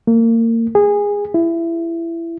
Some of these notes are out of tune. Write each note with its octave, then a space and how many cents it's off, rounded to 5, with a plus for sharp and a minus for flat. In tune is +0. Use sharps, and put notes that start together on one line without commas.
A#3 -30
G#4 -20
E4 +20